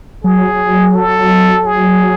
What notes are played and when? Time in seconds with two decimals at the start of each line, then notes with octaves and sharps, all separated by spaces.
0.24 F#3 G#4
0.95 A4
1.66 G#4